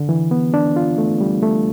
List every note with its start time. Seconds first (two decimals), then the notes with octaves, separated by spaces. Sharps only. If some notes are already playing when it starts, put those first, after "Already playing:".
Already playing: D3
0.09 E3
0.31 B3
0.54 D4
0.76 F4
0.98 A3
1.21 G3
1.43 A3